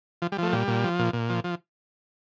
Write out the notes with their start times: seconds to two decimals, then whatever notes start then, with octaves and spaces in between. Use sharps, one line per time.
0.22 F3
0.32 G3
0.38 F3 A3
0.49 A3
0.53 A#2 G3
0.67 A#2
0.84 F3
0.99 A#2
1.13 A#2
1.29 F3
1.44 F3